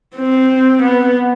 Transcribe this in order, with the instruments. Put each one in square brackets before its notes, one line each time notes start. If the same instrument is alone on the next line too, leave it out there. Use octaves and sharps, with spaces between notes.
[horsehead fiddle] C4
B3